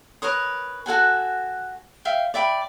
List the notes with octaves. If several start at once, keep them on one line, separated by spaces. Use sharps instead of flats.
A#4 B4 C#5 D#6
F#4 A4 F#5 G#5
E5 F5 G5
D5 E5 G5 B5